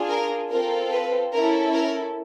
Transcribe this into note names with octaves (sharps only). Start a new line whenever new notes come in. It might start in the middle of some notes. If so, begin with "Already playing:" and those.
Already playing: D4 F4 G#4
A#4
C4 F4 A4 A#4
B4
C#4 E4 A4 A#4
A#4